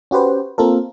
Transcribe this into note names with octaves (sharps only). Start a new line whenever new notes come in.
C#4 F#4 G4 B4 C5
A#3 C4 F4 A4 A#4